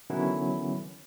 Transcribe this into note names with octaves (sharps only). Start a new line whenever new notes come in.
D3 D#3 F#3 B3 C#4 E4